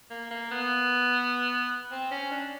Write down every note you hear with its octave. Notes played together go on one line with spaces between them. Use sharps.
A#3
A#3
B3
C4
C#4
D4